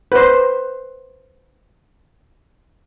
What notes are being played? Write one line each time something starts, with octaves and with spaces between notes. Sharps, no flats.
B4 C5